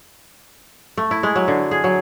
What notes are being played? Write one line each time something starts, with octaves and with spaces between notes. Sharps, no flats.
A3
E4
G#3
F#3
D3
G#4
F#3